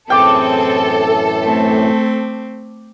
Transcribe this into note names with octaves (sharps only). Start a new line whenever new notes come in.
F#2 A2 E3 C4 G#4 A4 G5 D6
A3 C4